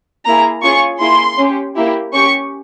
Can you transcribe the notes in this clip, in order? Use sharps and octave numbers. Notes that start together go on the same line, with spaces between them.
A#3 E4 G#4 A#5
C#4 F4 G#4 C#6
A#3 E4 G#4 C6
C#4 G4
A#3 E4 G4
C#4 G4 C#6